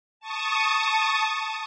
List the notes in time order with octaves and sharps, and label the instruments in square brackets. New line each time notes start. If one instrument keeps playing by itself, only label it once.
[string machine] A5 C#6 D#6